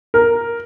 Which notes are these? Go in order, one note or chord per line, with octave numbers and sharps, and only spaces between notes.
A#4